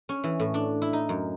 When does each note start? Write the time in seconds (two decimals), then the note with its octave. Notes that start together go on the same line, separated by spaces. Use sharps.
0.09 C#4
0.24 E3
0.40 A2
0.54 D4
0.82 E4
0.93 D#4
1.09 F#2